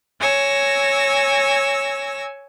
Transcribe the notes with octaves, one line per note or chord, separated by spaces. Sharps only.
C#5 G#5 E6 A#6